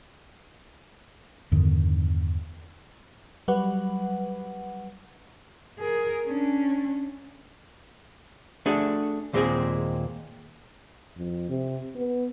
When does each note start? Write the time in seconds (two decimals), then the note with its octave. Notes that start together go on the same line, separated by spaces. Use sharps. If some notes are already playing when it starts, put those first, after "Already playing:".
1.52 E2 G2 D3 D#3
3.48 F#3 G3 B4 F#5
5.79 G#4 A#4
6.26 C#4 D4
8.66 A3 D4 F#4 G#4 A4
9.33 D#2 A#2 G#3 C4 G4 G#4
11.17 F2
11.49 C3
11.96 B3